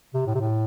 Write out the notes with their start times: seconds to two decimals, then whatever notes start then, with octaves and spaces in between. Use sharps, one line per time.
0.14 C3
0.27 A2
0.35 C3
0.40 A2